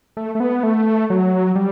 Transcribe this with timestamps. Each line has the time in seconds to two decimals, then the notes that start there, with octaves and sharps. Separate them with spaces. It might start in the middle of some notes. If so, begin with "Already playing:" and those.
0.17 A3
0.35 A3
0.40 B3
0.63 A3
1.10 F#3
1.55 G3